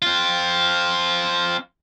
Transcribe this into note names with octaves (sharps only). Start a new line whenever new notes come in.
C4 F4